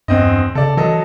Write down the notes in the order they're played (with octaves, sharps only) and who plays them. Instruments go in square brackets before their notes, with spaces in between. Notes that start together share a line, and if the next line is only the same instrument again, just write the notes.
[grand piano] E2 C4 D#5 [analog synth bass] G2
[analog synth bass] C#3 [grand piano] A4 D5
[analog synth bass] E3 [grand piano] F#3 A4 D#5